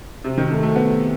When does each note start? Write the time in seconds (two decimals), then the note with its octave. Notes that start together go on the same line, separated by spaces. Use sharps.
0.24 C3
0.38 D#3
0.51 A3
0.63 A3
0.76 B3